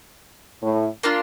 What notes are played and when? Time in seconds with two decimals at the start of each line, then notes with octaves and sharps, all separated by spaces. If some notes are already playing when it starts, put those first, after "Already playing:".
0.63 A2
1.03 A#3 D4 F4